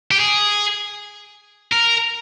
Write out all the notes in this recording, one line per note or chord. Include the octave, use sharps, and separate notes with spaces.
G4
G#4
A#4